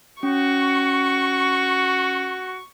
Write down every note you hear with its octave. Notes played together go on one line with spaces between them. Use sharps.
C#4 F#4 C#6